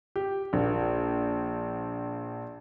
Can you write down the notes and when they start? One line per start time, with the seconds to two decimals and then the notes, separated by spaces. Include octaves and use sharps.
0.16 G4
0.53 A#1 A#3